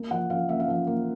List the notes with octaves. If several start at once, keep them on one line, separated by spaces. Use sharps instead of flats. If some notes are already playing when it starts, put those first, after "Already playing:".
Already playing: A#3
F3 F#5
F3 F5
A#3 E5
F5
F3 E5
A#3